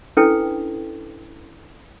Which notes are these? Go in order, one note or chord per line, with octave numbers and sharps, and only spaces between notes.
C#4 D4 E4 A4 B4 G5